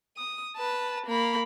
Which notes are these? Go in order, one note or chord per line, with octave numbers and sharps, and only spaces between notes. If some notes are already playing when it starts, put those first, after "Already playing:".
D#6
B4 A5
A#3 B5